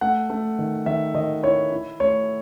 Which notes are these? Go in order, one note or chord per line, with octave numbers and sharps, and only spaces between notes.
A3 F#5
A3
D#3
D#3 E5
D#3 D#5
E4 C#5
E4
A3 C#5